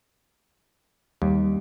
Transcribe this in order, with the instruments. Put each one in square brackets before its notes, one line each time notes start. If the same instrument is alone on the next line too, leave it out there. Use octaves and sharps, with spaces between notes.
[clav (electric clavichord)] D#2 [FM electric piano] G3